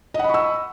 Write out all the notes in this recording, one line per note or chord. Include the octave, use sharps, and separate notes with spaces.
D#5 F#5 B5 C#6 E6